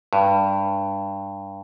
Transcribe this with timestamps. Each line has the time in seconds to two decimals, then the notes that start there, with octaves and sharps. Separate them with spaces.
0.13 G2